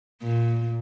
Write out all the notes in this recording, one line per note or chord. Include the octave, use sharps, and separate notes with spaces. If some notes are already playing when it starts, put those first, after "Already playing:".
A#2